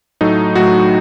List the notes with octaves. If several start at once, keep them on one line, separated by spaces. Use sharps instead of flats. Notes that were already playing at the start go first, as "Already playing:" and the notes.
A2 F#3 A3 D#4
A2 F#3 A3 F#4